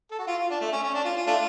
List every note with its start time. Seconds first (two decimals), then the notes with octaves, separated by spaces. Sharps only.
0.11 A4
0.18 F#4
0.27 F4
0.38 F4
0.50 D4
0.60 A3
0.72 C#4
0.83 C#4
0.94 D4
1.04 F4
1.16 F4
1.27 A3 D4 F4